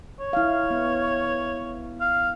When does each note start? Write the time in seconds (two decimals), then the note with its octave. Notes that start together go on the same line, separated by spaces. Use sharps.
0.20 C#5
0.33 E4 F5
0.71 B3
2.00 F5